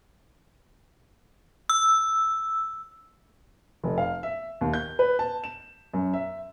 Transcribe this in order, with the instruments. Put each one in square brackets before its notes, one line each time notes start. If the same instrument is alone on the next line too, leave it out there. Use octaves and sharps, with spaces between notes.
[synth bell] E6
[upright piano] F1
F5
E5
D#2
G6
B4
A5
E7
F#2
E5